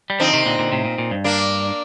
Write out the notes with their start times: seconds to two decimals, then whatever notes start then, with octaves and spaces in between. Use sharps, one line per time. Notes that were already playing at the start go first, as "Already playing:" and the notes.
0.10 G3
0.20 D3 F3 C4 D#4
0.33 C3 D#3
0.46 A#2 D3
0.59 A#2 D3
0.72 A2 C3
0.85 A#2
0.98 A#2
1.11 G2
1.24 A#3 D4